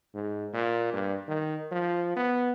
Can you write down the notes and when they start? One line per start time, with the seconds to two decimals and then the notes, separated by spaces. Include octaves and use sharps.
0.14 G#2
0.53 A#2
0.93 G2
1.28 D#3
1.72 F3
2.16 B3